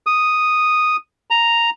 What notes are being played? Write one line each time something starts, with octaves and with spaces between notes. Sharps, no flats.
D#6
A#5